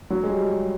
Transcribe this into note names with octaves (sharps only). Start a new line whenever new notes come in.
F#3
G#3
G3